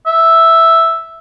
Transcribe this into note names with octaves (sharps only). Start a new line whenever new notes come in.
E5